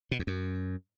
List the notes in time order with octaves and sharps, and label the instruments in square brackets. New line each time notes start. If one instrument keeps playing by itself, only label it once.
[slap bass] B2
E2
F#2